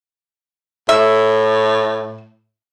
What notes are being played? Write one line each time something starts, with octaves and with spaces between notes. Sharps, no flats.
A2 E5